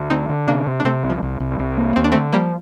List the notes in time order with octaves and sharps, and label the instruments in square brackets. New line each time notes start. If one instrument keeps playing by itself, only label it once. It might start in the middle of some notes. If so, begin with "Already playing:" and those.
Already playing: [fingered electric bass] D2
[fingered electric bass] D3 [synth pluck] C4 D#4
[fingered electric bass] D3
[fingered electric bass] C3 [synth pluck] A#3 D4
[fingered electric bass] C3
[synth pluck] D4
[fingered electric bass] C3 [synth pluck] A3 C4
[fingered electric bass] C2
[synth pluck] F3
[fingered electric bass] C2
C2
C2
A#3
[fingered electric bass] D#2 [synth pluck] C4
[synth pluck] D4
[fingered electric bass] D3 [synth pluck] A3 C4
[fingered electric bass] F3 [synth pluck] G3 A#3